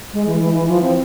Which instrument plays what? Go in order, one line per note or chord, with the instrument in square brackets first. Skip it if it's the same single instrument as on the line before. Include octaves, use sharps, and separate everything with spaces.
[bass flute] G#3
E3
E3
E3
F3
C4